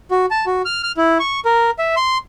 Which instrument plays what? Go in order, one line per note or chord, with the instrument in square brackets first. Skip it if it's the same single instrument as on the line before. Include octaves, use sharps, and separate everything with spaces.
[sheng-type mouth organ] F#4
A5
F#4
F6
F6
E4
C#6
A#4
E5
C6